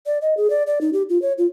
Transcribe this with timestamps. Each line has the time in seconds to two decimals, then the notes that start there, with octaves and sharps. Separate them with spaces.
0.06 D5
0.22 D#5
0.37 G#4
0.50 D5
0.67 D5
0.81 D#4
0.93 G4
1.09 F4
1.22 C#5
1.38 F4